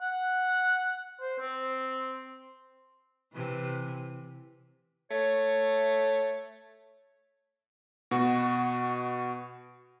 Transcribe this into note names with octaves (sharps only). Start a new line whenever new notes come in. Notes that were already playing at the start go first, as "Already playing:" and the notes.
F#5
C5
C4
C3 E3
A3 C#5
B2 F#4